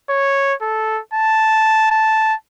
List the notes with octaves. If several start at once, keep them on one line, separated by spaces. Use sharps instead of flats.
C#5
A4
A5
A5